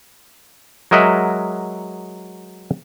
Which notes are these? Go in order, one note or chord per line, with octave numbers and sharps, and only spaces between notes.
F#3 G#3 A#4 D#5 E5 F#5